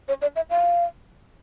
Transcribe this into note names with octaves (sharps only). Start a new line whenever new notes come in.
C#5
D5
E5
F5